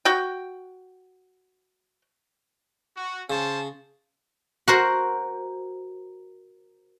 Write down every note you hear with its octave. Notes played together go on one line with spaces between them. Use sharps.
F#4 G5
F#4
C#3 C#4 C5 A5
F#4 A#4 C5